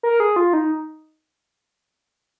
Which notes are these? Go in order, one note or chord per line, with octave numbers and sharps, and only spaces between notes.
A#4
G#4
F4
D#4